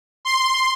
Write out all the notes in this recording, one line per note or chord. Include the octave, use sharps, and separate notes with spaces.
C6